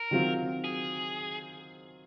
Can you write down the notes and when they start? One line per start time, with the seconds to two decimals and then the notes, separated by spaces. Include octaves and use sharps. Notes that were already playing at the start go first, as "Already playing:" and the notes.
Already playing: A#4
0.11 D#3 F#3 C4 F4
0.64 G#4